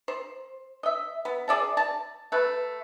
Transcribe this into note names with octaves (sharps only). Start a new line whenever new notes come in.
C5
D#5 E5
B3
G#4 D5 E5 A5
A5
A3 B4